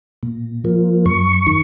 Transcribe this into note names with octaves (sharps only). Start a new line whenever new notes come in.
A#2
F3 A#3
F#2 C#6
D#3